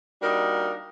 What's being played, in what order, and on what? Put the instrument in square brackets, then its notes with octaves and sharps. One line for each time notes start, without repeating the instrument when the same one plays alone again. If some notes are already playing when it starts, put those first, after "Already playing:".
[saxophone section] G3 A#3 D4 D#4 F#4 A#4